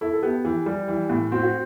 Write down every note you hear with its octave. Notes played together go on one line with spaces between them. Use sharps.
E4 A4
A4
B3 G4
E3 G4
G3 G4
E3
A2
C4 F#4
F#4